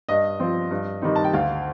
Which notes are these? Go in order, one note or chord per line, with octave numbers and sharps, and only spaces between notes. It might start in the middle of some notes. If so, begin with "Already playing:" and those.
G2 D#5
F3 C4
G2
D#3 G3 C4 D#4
A5
G5
D2 F5